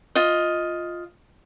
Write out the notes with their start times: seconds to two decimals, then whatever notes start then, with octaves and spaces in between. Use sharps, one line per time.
0.15 F4 D#5